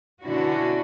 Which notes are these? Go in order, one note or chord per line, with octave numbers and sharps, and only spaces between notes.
B2 D3 C#4 D4 E4 F#4